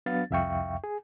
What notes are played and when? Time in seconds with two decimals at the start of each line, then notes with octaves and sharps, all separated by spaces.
0.06 F#3 B3 D4 F5 A6
0.30 C2 F2 E5 F5 G5 C#6
0.84 G#4